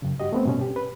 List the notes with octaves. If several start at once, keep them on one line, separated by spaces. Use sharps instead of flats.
F#2 C#3
G2 F#4 G4 D#5
A3 B3 C4
G2 B2 C#4
G4
B4